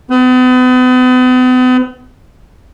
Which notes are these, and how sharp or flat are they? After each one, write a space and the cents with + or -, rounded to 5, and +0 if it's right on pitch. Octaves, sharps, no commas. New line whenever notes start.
B3 +40